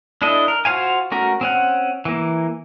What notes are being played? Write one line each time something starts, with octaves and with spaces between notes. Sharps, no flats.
D4 E4 A4 D#5
A#4
F4 F#4 C5 F5 G#5
A3 C#4 F#4 A#4
C4 C#4 F#5
E3 A#3